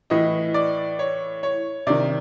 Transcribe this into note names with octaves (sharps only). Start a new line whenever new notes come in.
A2 E3 D#5
D5
C#5
C#5
C3 D#3 D5